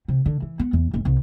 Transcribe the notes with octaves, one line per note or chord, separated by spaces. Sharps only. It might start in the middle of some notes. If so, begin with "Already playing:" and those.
C3
D3
E3
B3
E2
D#1
C2